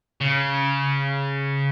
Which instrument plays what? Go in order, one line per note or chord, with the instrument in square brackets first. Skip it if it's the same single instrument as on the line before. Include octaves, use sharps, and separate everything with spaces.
[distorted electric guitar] C#3